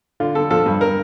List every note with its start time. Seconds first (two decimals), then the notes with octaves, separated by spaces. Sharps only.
0.20 D3 F4
0.35 D3 A4
0.50 F3 A4
0.66 G2
0.81 A#4